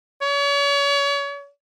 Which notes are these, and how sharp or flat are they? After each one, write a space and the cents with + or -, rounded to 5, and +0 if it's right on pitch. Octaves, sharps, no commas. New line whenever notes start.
C#5 +35